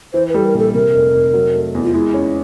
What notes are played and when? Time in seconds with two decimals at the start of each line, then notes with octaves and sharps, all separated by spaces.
0.13 E3 C5
0.29 B4
0.34 G3 A4
0.45 A#4
0.54 A#1 A4
0.74 C3 A#4
0.94 F1
1.14 F1
1.34 F#3
1.55 A3
1.75 E2
1.84 F4
1.94 G#3 E4
2.14 C#4